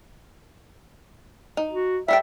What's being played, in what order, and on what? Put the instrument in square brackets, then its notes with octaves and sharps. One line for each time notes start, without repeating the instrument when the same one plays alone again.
[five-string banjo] D#4
[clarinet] F#4
[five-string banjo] G3 A4 G5 [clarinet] E5